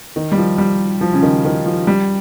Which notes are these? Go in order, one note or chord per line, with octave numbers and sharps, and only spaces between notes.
D#3
G3
F3
G3
F3
C#3
D#3
D#3
F3
G3